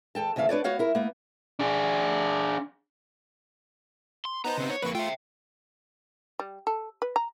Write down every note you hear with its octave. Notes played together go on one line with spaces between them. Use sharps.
E2 A4 G5 A5
D2 C#3 E3 E5 F5
D4 B4 C#5 D5
B3 F#4 C#5 F5 F#5
E4 A#4
A#3 B3
D4 G#4
C6
B3 D#4 C5 A5 A#5
C#3 C4
C#5
F2 A#3 B4 C#6
A3 F4 E5 G5
G3
A4
B4
A#5